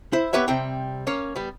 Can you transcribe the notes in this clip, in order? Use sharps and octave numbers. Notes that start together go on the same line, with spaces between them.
E4 C5
B3 G4 B4 C#5 E5
C3 G3 C4 G5
A#3 C#4 C#5
G3 B3